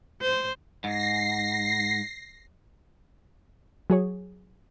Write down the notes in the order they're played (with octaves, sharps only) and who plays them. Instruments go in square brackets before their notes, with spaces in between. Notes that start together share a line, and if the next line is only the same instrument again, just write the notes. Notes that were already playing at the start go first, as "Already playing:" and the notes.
[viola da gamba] C5
[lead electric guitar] G#2 [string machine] A#6 C7
[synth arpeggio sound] F#3 G#4 C#5